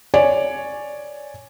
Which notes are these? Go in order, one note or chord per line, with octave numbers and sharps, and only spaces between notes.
C#5 D5 G#5